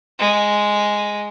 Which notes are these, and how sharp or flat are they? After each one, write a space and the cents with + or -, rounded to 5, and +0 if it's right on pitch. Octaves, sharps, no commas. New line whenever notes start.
G#3 +0